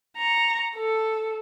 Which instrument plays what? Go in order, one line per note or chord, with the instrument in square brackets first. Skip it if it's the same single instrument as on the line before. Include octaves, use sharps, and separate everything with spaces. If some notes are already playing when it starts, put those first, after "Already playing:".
[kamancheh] A#5 C#6
A4